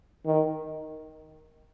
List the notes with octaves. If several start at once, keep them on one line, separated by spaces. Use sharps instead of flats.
D#3